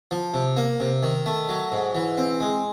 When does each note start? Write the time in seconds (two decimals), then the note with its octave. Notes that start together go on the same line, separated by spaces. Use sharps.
0.11 F3
0.34 C3
0.57 A#3
0.80 C3
1.03 D#3
1.26 A3
1.49 F#3
1.72 G#2
1.95 E3
2.18 C4
2.40 G#3